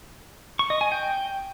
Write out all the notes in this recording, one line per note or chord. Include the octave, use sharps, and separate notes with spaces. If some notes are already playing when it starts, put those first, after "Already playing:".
C#6
D#5
G#5
G5